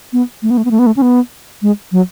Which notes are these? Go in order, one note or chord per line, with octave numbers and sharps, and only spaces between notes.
B3
A3
B3
A3
B3
A3
B3
A3
C#4
B3
G#3
F#3